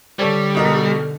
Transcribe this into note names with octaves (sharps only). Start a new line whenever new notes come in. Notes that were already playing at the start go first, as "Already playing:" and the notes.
D3 G3 A4 C#5 D5
B2 D#4 A#4